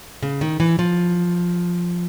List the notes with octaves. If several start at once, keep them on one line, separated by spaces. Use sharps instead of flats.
C#3
D#3
E3
F3